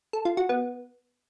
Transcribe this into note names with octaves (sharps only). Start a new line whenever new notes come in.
A4
F4
F#4
B3